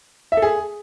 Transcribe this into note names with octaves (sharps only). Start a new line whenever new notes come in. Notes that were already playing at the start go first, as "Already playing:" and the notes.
E5
A4
G#4